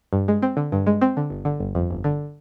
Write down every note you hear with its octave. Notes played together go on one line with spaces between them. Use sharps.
G2
G#3
C4
D3
G2
G#3
C4
D3
G1
D3
G1
F2
G1
D3